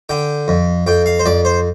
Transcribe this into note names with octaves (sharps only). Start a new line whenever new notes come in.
D3 G5
F2
F2 G5
F5
C5
F2 D5
C5